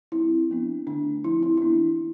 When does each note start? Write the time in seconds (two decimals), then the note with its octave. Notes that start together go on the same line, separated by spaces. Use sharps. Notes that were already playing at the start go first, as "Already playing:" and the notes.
0.12 G3 C4 E4
0.50 F3 B3 D4
0.87 D3 A3 D4
1.24 F3 C4 E4
1.43 E4
1.57 E4
1.62 E3 B3 D4